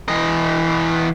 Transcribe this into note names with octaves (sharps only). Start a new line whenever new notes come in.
E3 D#5